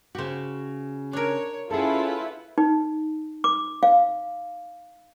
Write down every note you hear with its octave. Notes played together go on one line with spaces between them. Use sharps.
C#3 F#4 G4 C5
D4 A#4 C#5
C#4 E4 F4 G#4 A4 B4 F#5
D#4
D6
F5